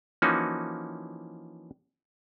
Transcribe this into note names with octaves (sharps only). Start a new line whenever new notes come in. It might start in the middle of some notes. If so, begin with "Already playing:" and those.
E3 F3 A#3 C#4 D#4 F#4